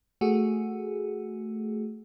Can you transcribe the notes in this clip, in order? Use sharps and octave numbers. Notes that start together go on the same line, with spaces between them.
A3 F#4 G#4